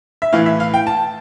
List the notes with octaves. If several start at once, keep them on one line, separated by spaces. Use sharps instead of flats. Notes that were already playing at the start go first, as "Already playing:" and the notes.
E5
A2 E3 F5
E5
F5
G5
A5